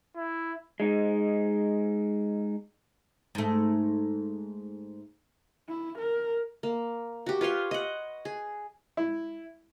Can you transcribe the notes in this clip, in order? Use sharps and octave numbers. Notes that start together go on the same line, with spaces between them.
E4
G#3 D#4
G#2 A3
E4
A#4
A#3
F#4 G4
F4 B4 C#5 C6
D#5 F#5
G#4
E4